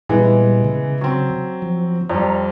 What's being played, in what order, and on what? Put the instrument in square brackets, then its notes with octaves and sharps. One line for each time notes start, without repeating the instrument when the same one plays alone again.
[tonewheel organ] A#2 G3 [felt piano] E3 G#3 B3
[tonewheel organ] C#3
[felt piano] F#3 C4
[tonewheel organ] F3
[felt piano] F2 G3 [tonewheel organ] D5 A#5